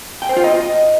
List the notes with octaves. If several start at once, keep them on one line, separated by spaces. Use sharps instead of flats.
G5
C5
F4
D#5